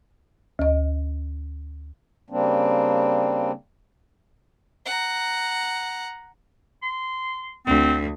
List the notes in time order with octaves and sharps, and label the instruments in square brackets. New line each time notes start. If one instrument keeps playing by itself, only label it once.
[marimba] D2 D#5
[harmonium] C#3 G3 A#3 C4 D4
[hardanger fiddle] F#5 A#5
[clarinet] C6
[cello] D2 [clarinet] C4